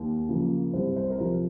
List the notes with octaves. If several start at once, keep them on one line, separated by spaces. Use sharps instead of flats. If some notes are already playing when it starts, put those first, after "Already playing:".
Already playing: D#2
C#3 F3 A#3
C2 C5
C5
A#4
C3 F3 C5